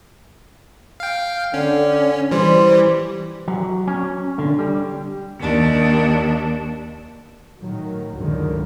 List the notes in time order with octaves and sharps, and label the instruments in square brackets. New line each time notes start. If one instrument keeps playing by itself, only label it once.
[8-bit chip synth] F5 G5
[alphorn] D3 [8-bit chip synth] C#4
[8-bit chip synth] E3 G3 [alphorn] C5
[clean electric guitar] F#3
C#4
D3
G3
[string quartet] D#2 D4
[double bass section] A2 D#3 F#3
C#2 F#2 D3 D#3